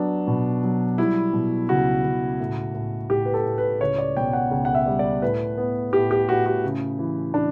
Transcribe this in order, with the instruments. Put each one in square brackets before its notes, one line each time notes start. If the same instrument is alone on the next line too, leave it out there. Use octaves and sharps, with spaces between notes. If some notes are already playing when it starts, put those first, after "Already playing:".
Already playing: [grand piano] F#3 B3 D4
B2
F#3
G3 E4
B2
C#2 F#4
C#2
A2
A2
A2 G4
B4
A4
A2
B4
C#2 C#5
D5
B2 G5
F#5
C#2 G5
F#5
E5
G3
D5
A2 B4
B3
A2 G4
G4
A2 F#4
F#4
C#3
E3
E3 D4